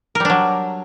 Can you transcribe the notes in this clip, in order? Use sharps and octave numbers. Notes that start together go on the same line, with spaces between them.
F#3 G3 D4 A#4